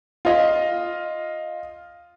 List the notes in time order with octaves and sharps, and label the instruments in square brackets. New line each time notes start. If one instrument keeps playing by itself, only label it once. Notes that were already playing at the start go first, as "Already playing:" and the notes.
[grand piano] F4 D#5 F5